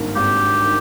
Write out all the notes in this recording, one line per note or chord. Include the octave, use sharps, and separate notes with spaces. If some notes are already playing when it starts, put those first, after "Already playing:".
Already playing: G#1 G2 D#3 A#3
G#1 G4
D#3